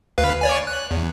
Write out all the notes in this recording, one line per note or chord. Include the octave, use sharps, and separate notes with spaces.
D2 B4 F5
C#5 D5 G#5
F#6
E2